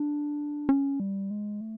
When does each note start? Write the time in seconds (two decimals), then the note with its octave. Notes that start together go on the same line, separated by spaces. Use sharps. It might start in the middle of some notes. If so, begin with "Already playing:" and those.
Already playing: D4
0.69 C#4
1.00 G3
1.31 G#3
1.61 A3